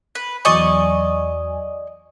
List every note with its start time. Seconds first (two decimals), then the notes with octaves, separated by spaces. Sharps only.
0.15 B4
0.45 E2 F#3 D5 D#5 G#5 C#6